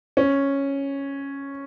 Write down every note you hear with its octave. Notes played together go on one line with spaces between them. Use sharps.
C#4